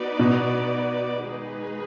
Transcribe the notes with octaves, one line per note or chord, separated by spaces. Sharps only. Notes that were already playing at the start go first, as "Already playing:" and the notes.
Already playing: B3 D#4 F#4 B4 D5
B2
D#3 G#3 D#4 G#4 B4